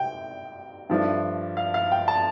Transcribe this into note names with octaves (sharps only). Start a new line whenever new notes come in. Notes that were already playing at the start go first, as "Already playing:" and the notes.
Already playing: C3 G3 G5
G2 F3 A3 D4
F5
F5
G5
A5